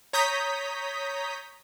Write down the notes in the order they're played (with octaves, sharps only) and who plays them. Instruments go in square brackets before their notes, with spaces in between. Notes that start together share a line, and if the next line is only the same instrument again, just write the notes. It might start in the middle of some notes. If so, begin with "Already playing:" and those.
[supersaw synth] C#5 A#5 D#6 G6 B6